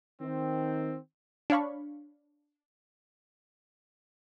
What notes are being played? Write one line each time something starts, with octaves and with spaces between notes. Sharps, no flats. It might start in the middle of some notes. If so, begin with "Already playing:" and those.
D#3 C4
D4 C#5 F5 B5 C#6